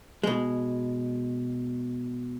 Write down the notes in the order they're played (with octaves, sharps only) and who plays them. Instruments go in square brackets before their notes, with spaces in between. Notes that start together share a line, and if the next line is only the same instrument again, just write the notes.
[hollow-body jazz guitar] B2 G#3